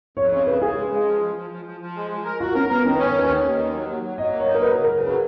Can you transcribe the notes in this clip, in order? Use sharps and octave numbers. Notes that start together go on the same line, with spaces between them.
F2 C#5
C#3 C#5
C#3 B4
C#3 G#4
G#3
G#3
F3
F3
F3
F3
F3
F3
G#3
G#3
A#4
F4 F#4
C#4 A#4
B3 A#4
D#3 C#4
B4
C#4
C#5
D#2 B4
D#3 C#5
D#3
D#2
F#3
F#3
F#3
F#3 D#5
A#3
C#5
D#4
A#4
F#3 B4
C#3
A#4
C#3
A#4
F#3 B4